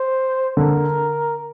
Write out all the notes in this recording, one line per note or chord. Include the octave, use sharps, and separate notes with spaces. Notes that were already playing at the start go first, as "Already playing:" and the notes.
Already playing: C5
D3 A#4